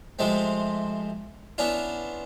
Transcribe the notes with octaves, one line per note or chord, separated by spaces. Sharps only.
C3 F3 G#3 A3 C4
B3 C#4 D4 E4 F4